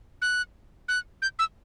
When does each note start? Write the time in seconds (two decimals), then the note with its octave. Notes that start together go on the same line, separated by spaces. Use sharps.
0.22 F#6
0.88 F#6
1.22 G6
1.39 E6